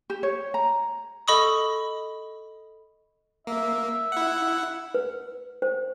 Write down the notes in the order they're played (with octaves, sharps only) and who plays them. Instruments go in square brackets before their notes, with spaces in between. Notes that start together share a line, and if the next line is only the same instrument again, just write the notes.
[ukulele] G4
C#5
A#5
[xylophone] A4 D#5 B5 C#6 D#6
[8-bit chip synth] A#3 [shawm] E5
[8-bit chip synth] E4 F#5
[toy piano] B4
C5